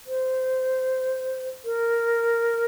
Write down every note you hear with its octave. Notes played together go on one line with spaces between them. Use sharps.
C5
A#4